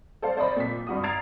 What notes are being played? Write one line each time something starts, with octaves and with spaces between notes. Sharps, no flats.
A4 C5 D5 F5
C5 D5 D#5 B5
A#2 B6
G2 F#4 D#6
A#5 G#6 A6 C7 D7 F7